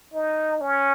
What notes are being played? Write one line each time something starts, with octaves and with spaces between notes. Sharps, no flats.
D#4
C#4